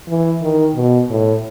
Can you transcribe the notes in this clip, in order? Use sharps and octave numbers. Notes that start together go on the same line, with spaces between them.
E3
D#3
B2
A2